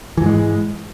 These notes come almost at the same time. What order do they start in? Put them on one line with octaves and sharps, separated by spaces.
E3 G#2 G#3